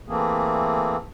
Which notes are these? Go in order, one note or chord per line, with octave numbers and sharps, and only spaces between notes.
E3 A3 A#3 C4 G#4